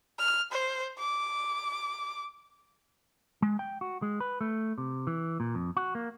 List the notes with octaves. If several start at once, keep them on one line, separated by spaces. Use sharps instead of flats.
F6
C5
D6
G#3
G5
F#4
G#3
B4
A3
C3
E3
A#2
F2
F#4
A#3